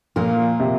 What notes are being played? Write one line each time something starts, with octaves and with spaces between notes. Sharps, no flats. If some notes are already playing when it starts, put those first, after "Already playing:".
A#2 F3 A#3 F4 A#4
C3